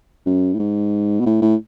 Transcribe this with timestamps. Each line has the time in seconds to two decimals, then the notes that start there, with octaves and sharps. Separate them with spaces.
0.26 F#2
0.54 A2
0.59 G#2
1.20 B2
1.26 A2
1.42 A2